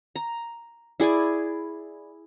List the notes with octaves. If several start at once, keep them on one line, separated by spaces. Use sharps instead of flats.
A#5
E4 G#4 D5 G#5